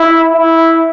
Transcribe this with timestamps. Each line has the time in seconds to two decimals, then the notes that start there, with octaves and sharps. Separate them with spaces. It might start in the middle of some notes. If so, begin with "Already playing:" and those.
Already playing: E4
0.33 E4